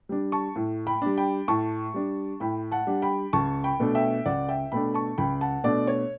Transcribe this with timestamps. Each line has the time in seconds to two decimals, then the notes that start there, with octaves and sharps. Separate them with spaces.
0.09 G3 D4
0.32 A5 C#6
0.56 A2
0.87 G5 B5
1.02 G3 D4
1.18 G5 B5
1.48 A2 A5 C#6
1.94 G3 D4
2.40 A2 G5 B5
2.72 F#5 A5
2.87 G3 D4
3.02 G5 B5
3.33 C#2 A5 C#6
3.64 G5 B5
3.80 B2 A3 D4
3.95 E5 G5
4.26 C#2 D5 F#5
4.49 E5 G5
4.72 B2 A3 D4 G5 B5
4.94 A5 C#6
5.18 C#2 G5 B5
5.41 F#5 A5
5.64 B2 A3 D4 D5
5.87 C#5